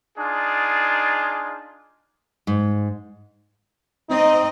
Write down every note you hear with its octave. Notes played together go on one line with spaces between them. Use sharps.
D4 D#4 F4 G#4
G#2
C4 D#4 D#5